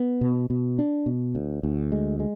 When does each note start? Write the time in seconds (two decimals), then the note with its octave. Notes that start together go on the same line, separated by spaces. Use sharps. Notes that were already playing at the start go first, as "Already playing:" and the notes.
Already playing: B3
0.21 B2
0.50 B2
0.79 D4
1.06 B2
1.35 D2
1.63 D2
1.92 G#3
2.20 G#3